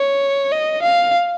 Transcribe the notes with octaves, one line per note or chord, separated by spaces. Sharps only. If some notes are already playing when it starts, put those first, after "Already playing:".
Already playing: C#5
D#5
F5